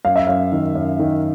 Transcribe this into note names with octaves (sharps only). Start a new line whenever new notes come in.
F#2 F5
E5
F#2 F5
D#3
F#2
D#3